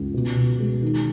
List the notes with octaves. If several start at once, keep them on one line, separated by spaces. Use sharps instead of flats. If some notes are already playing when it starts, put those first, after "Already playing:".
Already playing: C#2
B2
B2
G#3
D#3